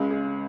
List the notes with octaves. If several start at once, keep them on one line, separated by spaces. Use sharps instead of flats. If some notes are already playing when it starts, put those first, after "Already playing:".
Already playing: C#2 C#3 G#3
G#4